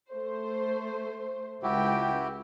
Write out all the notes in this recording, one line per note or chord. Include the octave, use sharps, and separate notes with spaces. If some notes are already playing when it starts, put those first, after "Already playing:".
A3 C5
C#2 E4 F#4 G4 G5